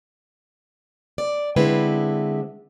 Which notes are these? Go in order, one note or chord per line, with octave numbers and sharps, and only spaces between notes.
D5
D3 G#3 C4 E4 B4